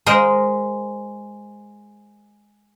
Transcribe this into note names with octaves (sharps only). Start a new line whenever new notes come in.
G#3 A#4 C5 D#5